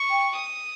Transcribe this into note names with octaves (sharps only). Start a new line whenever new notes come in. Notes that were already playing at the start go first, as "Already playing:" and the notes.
Already playing: C#6
G5
D#6